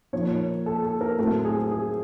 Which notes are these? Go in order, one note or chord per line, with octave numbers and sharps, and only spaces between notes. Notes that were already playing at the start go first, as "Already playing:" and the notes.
A#2 F3 A#3 D#4 C#5
A4
A4
A#4
A2 F#3 A3 C4 A4
G#4
G#4